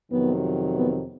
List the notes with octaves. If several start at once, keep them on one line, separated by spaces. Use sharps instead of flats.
F2 C3 D#3 F#3 B3
B3